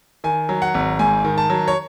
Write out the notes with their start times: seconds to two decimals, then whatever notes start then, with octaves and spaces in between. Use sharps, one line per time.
0.24 D#3 G#5
0.49 F#3
0.62 F#5
0.74 G#1
0.99 G#2 G#5
1.24 D#3
1.38 A5
1.50 F#3
1.68 C#5